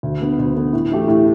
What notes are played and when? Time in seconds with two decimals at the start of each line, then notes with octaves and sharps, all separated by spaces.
0.03 D2
0.20 D3 B3
0.39 D2
0.56 D3 B3
0.73 A2
0.91 E3 A3 G4
1.08 A2